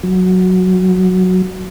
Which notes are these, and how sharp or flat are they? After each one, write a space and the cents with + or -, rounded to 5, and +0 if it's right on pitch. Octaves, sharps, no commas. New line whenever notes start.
F#3 -5